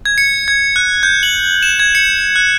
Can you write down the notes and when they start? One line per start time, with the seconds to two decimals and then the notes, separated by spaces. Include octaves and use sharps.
0.05 G#6
0.18 C#7
0.48 G#6
0.76 F#6
1.03 G6
1.23 F#7
1.63 E7
1.80 G#6
1.95 C#7
2.36 F#6